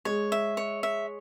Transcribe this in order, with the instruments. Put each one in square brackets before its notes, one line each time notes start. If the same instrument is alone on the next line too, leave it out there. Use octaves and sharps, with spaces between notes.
[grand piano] G#3 [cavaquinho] C#5
[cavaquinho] E5
C#5
E5